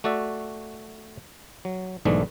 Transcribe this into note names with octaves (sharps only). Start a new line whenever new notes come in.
A3 F#4 D5 E5
F#3
B1 G#2 E3 A3 D4